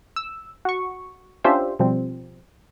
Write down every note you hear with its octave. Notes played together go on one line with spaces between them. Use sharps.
E6
F#4 C#6
C#4 D4 F4 G4 C5 E5
B2 F3 G3 C4